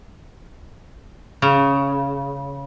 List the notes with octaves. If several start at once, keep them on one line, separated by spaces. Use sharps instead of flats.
C#3